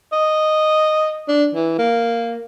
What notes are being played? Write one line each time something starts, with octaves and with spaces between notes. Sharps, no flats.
D#5
D4
E3
A#3